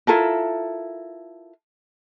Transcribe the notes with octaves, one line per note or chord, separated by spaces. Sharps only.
E4 F4 A4 A#4